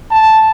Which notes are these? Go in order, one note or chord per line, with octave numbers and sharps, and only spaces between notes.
A5